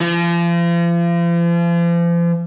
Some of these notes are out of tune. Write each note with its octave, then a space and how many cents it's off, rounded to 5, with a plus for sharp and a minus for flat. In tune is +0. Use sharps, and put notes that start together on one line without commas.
F3 -40